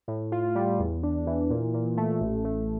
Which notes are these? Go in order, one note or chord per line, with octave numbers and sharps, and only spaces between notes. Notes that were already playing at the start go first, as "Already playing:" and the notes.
A2
F4
G3
E2
D4
E3
A#2
A#2
A3
A1
A3